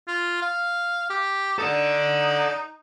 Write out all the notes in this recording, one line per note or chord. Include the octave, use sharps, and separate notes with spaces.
F4
F5
G4
D#4 A4 D5